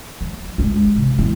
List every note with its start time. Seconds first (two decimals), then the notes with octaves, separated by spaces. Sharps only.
0.21 F#3
0.58 G#3 D4
0.96 C3
1.18 E2 C4